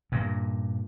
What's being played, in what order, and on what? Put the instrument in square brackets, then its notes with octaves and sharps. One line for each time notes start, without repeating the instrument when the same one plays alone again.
[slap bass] G2 A#2